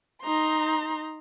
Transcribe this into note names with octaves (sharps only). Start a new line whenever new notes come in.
D#4 A#5 C6